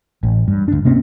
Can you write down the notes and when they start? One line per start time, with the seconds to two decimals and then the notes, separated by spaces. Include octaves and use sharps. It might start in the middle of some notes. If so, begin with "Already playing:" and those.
0.23 A1
0.48 G2
0.68 D2 D4
0.85 C3 A#3 C4 C#4